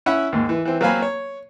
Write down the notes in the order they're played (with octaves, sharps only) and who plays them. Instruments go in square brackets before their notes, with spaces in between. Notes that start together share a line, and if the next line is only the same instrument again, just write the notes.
[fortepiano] C#4 E4 E5 F#5 B5
D#2 G#2
E3
E3 C4
F#3 A#3 C4 F5 G#5 B5
C#5